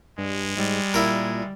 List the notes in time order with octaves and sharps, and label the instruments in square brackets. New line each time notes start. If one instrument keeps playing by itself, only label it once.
[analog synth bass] G2 [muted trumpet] G#3
[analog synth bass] G#2 [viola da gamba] G3
[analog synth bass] A#2 [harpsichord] E4 A#4